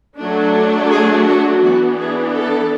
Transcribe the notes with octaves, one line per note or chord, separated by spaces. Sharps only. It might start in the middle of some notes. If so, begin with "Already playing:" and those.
F#3 A3 D4
G#4
F#4
E3 B3 D4 F#4
G#4
A4